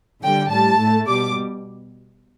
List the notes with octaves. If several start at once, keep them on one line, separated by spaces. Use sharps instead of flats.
D3 G3 G5
A2 G3 A5
A2 A3
B2 G3 D6